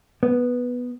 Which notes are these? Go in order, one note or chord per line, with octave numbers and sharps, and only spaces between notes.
B3